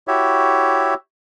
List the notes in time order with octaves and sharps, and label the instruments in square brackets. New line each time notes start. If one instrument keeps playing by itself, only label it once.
[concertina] E4 F#4 G4 C#5 E5